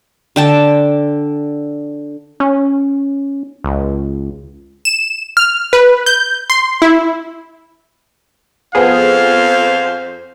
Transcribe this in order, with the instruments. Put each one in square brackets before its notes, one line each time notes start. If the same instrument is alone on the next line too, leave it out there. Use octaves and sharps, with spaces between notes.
[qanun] D3 G5 A5
[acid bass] C#4
C#2
[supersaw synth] E7
F6
B4
G6
C6
E4
[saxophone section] F2 C5 [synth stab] F3 B3 G#4 [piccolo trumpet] F5